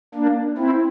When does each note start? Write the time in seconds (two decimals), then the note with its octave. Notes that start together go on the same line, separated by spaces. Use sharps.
0.15 A#3 D4
0.58 C4 E4